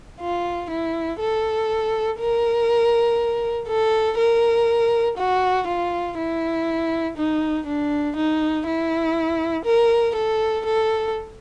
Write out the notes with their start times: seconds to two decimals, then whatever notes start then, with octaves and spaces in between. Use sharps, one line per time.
0.20 F4
0.70 E4
1.20 A4
2.20 A#4
3.68 A4
4.18 A#4
5.17 F#4
5.67 F4
6.17 E4
7.17 D#4
7.66 D4
8.16 D#4
8.66 E4
9.65 A#4
10.16 A4
10.66 A4